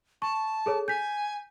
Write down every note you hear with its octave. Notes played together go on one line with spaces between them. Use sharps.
A5 C#6
G#4 A4 C#5
G#5 G6 B6